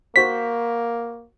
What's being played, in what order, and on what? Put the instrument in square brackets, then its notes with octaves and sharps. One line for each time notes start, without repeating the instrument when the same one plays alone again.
[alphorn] A#3 [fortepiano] F#4 C5 [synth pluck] B6